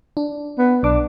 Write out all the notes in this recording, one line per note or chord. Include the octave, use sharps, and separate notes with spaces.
D4
B3
B1 D4 D6